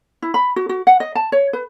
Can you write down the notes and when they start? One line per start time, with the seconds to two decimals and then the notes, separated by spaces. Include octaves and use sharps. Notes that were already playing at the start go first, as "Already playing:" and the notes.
0.22 E4
0.34 B5
0.56 F#4
0.69 F#4
0.87 F#5
1.00 D#5
1.15 A5
1.32 C#5
1.53 B4